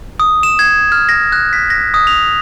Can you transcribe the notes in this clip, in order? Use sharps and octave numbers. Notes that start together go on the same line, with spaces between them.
D#6
E7
G#6
F6
A#6
F#6
B6
A#6
D#6
F7